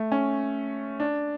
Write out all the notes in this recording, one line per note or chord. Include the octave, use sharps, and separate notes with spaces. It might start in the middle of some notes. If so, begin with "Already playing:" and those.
Already playing: A3
C#4
D4